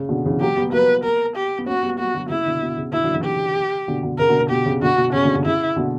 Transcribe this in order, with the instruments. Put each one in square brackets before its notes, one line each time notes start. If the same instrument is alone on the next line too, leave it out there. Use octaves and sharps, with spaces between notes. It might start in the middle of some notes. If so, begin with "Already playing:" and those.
Already playing: [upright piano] C#3
B2 D3
C#3 E3
[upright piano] F#3 A#3 [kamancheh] G4
[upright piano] G3 B3
[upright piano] F#3 A#3 [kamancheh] B4
[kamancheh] A#4
G4
[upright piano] B3
[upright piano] A#3 C#4 [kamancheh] F#4
[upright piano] G3 B3
[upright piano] F#3 A#3 [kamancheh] F#4
[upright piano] D3 F#3
[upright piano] C#3 [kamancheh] E4
[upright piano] B2 D3
B2
C#3
[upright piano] B2 D3 [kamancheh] E4
[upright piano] D3 F#3
C#3 E3
[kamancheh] G4
[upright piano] B2 D3
B2 D3
[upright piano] C#3 [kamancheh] A#4
[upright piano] B2 D3
B2
[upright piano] B2 [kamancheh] G4
[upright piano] C#3
[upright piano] B2 D3 [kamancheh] F#4
[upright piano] B2
[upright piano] C#3 [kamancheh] C#4
[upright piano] B2 D3
C#3
[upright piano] C#3 [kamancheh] E4
[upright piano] B2 D3